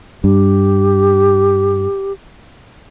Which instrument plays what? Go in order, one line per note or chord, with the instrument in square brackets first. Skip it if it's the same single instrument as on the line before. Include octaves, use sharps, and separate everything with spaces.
[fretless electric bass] G2 [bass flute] G4